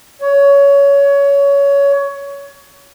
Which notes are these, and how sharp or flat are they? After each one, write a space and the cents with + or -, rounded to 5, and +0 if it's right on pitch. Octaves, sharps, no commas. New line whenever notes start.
C#5 +20